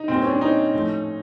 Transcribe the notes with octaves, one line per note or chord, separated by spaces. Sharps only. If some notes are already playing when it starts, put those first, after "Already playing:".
Already playing: D#4
A#2 G3 C4
C#4
D4
C#4 D#4
A2 F3 A3